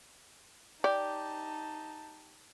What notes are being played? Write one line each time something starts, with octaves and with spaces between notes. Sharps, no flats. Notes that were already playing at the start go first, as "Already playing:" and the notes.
D#4 G4 D5 A5